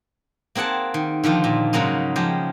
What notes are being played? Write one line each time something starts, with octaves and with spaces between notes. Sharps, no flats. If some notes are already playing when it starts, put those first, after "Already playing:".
A#3 C4 G#4 F#5 A5
D#3
D3 D#3 F3 F4
A#2
G#2 C#3 F#3 A#3 C#4 D#4
F3 G#3 G4